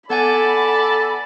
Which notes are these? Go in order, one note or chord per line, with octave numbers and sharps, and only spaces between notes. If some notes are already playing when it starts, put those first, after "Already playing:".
B3 A4 D5 F#5 G#5 B5